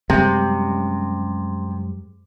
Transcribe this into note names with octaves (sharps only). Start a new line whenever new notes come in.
F#2 C3 G3 G#3